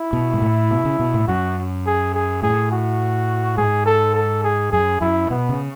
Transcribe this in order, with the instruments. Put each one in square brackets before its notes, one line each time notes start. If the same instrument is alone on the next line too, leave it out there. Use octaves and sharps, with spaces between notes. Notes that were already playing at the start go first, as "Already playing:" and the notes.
Already playing: [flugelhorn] E4
[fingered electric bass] B2
G#2
A2
B2
C#3
B2
A2
[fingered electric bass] F#2 [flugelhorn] F#4
[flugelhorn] G#4
G#4
[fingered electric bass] A2 [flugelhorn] G#4
[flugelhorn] F#4
[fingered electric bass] G#2 [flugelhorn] G#4
[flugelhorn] A4
A4
G#4
[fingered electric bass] F#2 [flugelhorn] G#4
[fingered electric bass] F#2 [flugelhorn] E4
[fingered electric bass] B2 [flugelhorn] B3
[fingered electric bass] C#3